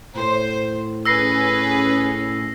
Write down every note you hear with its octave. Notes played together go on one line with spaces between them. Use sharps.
A2 C5
C#4 G#4 B4 E6 A#6 C7